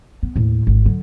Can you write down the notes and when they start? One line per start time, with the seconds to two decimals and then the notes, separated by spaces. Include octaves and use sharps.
0.23 B3
0.36 D#2 A2
0.67 G#1 G#2
0.85 D3 F#3